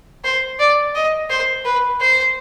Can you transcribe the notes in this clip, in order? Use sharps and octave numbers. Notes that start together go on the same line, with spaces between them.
C5
D5
D#5
C5
B4
C5